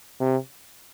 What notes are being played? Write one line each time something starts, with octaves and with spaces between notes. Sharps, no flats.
C3